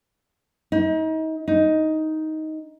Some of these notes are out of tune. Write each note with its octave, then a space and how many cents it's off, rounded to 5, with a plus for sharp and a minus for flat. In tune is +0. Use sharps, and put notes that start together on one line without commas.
D#4 +35
D#4 +10